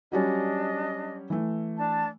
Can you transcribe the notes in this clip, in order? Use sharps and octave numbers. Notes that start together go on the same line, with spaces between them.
F#3 G3 C#4 D4 D#5
E3 A3
D4 A5